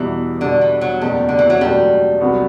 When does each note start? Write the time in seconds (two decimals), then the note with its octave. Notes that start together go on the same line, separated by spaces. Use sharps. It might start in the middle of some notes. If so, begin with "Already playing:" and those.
Already playing: E2 B2 E3 G3
0.41 E2 B2 D3 G3
0.61 E3
0.81 F#3
1.01 F#1 E2 B2 F#3 G3 A3
1.29 D3
1.39 E3
1.50 F#3
1.61 F#1 E2 B2 F#3 G3 A3
2.20 C2 C3 F#3 B3 F#4